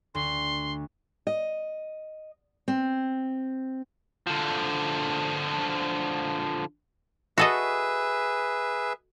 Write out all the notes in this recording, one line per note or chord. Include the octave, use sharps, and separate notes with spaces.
D2 C6
D#5
C4
D3 F3
F#4 G#4 A4 B4 D#5 E5